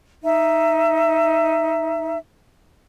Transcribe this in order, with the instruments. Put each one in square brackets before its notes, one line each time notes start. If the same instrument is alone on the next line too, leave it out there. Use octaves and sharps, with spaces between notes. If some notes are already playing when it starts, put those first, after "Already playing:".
[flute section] D#4 E5